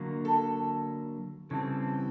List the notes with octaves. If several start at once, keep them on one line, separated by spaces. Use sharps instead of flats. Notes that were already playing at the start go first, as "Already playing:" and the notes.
Already playing: D3 F#3 A#3
A4
C#3 E3 G3 C4 A4